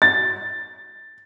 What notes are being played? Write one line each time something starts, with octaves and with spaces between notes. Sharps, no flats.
A6